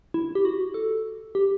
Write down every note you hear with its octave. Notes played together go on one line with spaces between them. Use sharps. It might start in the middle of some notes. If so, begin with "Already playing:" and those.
E4
G4
F#4
A4
G4